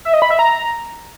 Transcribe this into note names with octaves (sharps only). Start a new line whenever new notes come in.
E5
D#5
B5
E5
A#5